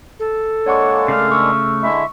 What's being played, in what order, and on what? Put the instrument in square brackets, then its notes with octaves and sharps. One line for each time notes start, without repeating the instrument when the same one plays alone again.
[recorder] A4
[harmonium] G#3 A#3 D4 [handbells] C#5 F#5 C#6
[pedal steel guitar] C#3 A3 F5 [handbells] C7
[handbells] C#6 E6
[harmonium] D3 G#3 E4 [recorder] E5